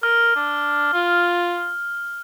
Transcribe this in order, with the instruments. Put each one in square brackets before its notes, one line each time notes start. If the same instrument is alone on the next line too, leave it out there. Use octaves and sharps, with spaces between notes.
[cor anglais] A#4 [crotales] F6
[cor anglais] D4
F4